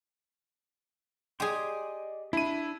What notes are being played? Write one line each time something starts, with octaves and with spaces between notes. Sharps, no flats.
G4 G#4 D5 D#5 C6
D4 E4 D#7